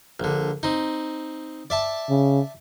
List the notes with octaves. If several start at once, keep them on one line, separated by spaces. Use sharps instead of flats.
A#1 D3
C4 D#4
D5 E5 A5
C#3